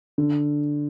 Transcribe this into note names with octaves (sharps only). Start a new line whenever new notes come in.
D3